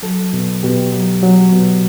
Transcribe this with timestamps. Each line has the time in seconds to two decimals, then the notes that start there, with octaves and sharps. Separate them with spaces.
0.03 F#3 A4
0.33 B2
0.63 B2 G4
0.94 F#3
1.23 F#3
1.53 B2